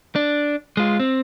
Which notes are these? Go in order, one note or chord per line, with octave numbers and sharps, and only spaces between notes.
D4
G#3 F4
C4